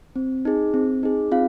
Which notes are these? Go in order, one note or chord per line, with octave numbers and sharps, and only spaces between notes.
C4
D#4 G#4
C4
D#4 G#4
C4 F4 F5